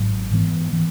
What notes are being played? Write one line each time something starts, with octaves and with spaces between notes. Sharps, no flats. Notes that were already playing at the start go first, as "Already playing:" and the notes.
Already playing: G#1 G#2 F#3
G#2 E3 B3
E3 B3